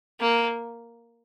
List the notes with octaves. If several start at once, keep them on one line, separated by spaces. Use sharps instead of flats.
A#3